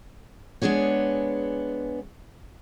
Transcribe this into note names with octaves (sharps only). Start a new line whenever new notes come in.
G#3 B3 D4 G#4 C#5